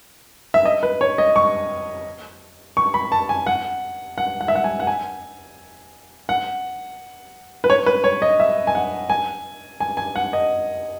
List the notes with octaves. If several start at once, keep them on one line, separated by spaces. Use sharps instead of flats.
E5
D#5
B4
C#5
D#5
C#6
C#6
B5
A5
G#5
F#5
F#5
F#5
E5
F#5
G#5
F#5
G#5
F#5
B4
C#5
B4
C#5
D#5
E5
G#5
F#5
G#5
G#5
G#5
F#5
D#5